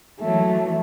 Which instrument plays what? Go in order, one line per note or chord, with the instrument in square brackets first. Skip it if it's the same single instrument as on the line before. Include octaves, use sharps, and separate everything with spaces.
[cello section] E3 F#3 [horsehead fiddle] A3